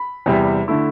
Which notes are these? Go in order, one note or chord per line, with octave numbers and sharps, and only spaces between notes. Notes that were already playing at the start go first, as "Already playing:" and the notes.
Already playing: B5
E2 C3 G3
D3 A3 E4